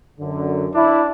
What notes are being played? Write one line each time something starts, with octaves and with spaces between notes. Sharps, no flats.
F#2 D3
D4 E4